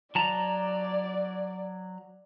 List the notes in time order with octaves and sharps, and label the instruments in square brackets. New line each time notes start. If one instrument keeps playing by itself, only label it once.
[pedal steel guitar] F#3 A5 A#5 [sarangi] D5